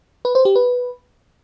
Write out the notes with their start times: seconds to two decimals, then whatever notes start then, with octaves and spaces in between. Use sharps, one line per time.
0.25 B4
0.35 C5
0.45 G4
0.56 B4